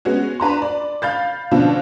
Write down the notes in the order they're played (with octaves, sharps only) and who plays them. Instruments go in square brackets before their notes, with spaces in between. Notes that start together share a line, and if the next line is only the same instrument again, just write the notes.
[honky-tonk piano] G#3 B3 C#4 F#4
D4 B4 A#5 C6
D5
F5 B5 G6 A6
B2 D3 F3 C#4 D4 F4